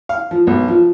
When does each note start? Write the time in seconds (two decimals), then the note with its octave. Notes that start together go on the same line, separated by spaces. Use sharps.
0.09 F5
0.31 F3
0.47 B1
0.68 F3